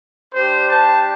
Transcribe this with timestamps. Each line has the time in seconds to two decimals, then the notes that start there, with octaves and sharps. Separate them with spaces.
0.34 G3 D4 G4 C5
0.70 A5